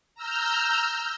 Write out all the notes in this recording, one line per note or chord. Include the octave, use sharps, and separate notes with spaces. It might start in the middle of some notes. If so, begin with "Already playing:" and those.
A#5 E6 F6 G6